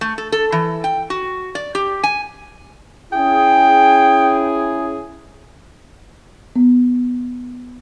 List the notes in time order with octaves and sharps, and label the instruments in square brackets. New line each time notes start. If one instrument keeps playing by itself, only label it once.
[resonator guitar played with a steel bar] A3
A4
A4
E3
G5
F#4
D5
G4
G#5
[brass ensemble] C#4 E4 G#4 [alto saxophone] G5
[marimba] B3